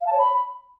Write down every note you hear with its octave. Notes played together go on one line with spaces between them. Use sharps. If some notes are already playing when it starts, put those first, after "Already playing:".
F5
A5
C#5
B5